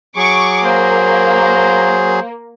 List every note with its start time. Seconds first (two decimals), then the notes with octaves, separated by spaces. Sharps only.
0.16 F#3 G#4 C#6 D6
0.65 A#3 C5